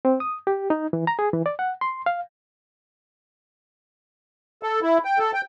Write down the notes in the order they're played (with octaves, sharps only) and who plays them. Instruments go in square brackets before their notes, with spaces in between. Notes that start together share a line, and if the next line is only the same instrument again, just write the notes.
[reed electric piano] C4
D#6
G4
D#4
E3
A#5
G#4
E3
D5
F#5
C6
F5
[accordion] A4
E4
G5
A4
G5